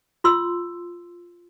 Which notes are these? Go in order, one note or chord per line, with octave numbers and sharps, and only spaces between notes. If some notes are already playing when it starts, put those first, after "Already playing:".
F4 C6 E6